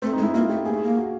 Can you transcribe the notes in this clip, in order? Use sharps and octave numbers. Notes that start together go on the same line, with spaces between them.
A3 C4
D#4
G#3
E4
A#3 F4
A3 G4
A#3 G#4
A3
A#3
F#4